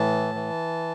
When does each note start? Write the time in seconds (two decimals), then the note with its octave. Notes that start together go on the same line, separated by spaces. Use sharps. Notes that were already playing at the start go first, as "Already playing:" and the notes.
Already playing: A2 E3 A5
0.35 E3